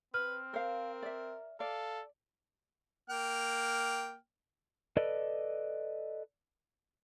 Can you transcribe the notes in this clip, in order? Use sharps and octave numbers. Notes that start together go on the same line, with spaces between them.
C4 B4 F6
A#4 C5 F5
D5 E5
A4 D5 F5
A#3 G5 F6
A4 B4 D5 D#5